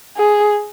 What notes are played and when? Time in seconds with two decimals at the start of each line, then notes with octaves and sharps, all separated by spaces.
0.17 G#4